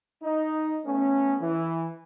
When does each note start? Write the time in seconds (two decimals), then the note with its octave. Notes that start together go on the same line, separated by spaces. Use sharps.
0.23 D#4
0.85 A3 B3 C#4
1.41 E3